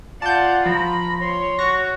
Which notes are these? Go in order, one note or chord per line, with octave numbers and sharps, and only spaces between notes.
F4 D5 F#5 A5 G6
F3 A#5 B5
C#5 C6
F#4 C#6 A#6